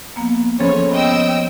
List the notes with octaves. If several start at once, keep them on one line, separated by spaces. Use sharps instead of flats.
F3 A#3 B3
F3 C#4 G#4 A4 C#5 B5
B3 D#5 G5 E6